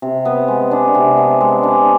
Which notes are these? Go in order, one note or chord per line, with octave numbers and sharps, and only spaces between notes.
C3
B3
G#3
D4
C3
B3
G#3
D4